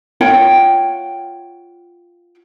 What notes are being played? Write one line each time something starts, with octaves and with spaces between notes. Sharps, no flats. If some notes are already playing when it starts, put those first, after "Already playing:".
F4 C#5 F#5 G5